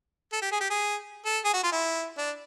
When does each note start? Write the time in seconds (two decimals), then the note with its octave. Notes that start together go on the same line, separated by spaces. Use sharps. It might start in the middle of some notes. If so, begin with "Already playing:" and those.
0.33 A4
0.42 G4
0.52 G#4
0.61 G4
0.70 G#4
1.26 A4
1.45 G#4
1.54 F#4
1.63 F4
1.72 E4
2.18 D4